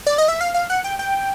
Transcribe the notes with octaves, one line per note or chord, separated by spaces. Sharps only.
D5
D#5
E5
F5
F5
F#5
G5
G5